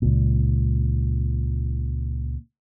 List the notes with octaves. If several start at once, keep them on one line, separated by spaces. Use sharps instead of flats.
C#2 A#2